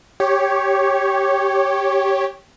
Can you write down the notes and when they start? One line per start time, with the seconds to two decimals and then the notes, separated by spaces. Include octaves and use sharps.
0.20 G4 C#5